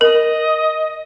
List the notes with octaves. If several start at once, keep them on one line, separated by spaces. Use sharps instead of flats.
A#4 D#5